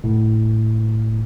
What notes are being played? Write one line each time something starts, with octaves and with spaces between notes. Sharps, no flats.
A2